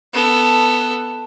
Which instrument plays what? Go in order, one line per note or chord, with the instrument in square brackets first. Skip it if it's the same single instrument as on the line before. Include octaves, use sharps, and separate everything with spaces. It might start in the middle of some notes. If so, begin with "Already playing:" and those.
[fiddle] B3 A4